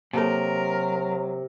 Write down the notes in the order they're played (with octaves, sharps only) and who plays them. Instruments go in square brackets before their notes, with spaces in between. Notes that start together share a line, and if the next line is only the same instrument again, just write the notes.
[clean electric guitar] C3 [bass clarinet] F#3 [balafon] A#3 A4 A5 [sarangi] A#4